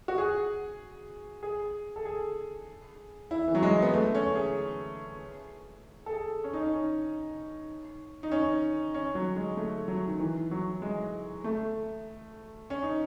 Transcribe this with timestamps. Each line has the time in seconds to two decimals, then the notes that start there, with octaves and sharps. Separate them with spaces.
0.08 F#4
0.18 G#4
1.43 G#4
1.96 A4
2.05 G#4
3.31 E4
3.47 E3
3.55 F#3
3.63 G#3
3.82 B3
3.93 A3
4.15 C#4
4.35 G#4
6.06 A4
6.12 G#4
6.44 C#4
6.53 D#4
6.63 C#4
8.23 D#4
8.31 C#4
8.94 C#4
9.15 F#3
9.36 G#3
9.57 A3
9.88 F#3
10.08 D#3
10.19 E3
10.51 F#3
10.82 G#3
11.44 A3
12.70 C#4
12.83 D#4